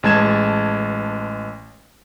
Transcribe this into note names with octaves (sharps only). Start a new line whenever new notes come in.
A1 G#3 A5 G#6 E7